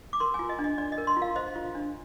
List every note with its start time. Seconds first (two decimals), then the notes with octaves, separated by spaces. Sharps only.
0.13 D6
0.20 A#4 C6
0.34 G#5
0.39 F4
0.49 D#5
0.59 D4
0.64 D#5
0.78 D4 D5
0.92 D#5
0.98 A#4
1.07 C6
1.17 F4
1.22 F5
1.36 C5 D#5
1.56 F4
1.75 D4